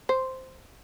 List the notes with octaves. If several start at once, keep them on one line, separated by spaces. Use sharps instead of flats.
C5